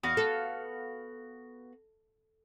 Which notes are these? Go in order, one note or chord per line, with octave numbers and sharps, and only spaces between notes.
E2 B3 F#4 F5
A4